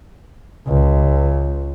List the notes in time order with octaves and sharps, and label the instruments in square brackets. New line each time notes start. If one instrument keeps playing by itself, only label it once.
[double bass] C#2